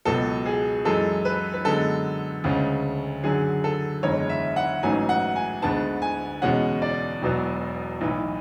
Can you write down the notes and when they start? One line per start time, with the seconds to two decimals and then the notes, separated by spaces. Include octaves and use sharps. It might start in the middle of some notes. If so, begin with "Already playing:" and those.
0.05 C#2 B2 F#3 B3 A4
0.46 G#4
0.85 F#2 E3 G#3 A4
1.25 B4
1.54 B4
1.65 F#2 D3 G#3 B3 A4
2.44 D2 C#3 G#3 C#4
3.23 F#2 D3 F#3 G#4
3.64 A4
4.03 F#1 E2 D3 G#3 C#5
4.29 E5
4.56 F#5
4.83 A1 G#2 F#3 A3 C#4 G#5
5.09 F#5
5.36 G#5
5.62 D2 D3 G#3 B3 A5
6.02 G#5
6.42 E2 B2 G#3 C#4 F#5
6.82 D5
7.22 E1 E2 B2 F#3 B3
8.01 B1 A2 E3